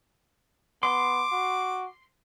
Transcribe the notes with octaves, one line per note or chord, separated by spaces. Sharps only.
B3 C6 D6
F#4